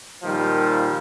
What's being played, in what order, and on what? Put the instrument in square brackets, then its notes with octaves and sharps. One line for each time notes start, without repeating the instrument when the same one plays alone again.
[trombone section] A#2 D#3 F3 G3